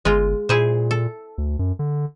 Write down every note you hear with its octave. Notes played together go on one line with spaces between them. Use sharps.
G1 G#3 F4
A#2 E4 G#4 C5
A4
D2
F#2
D3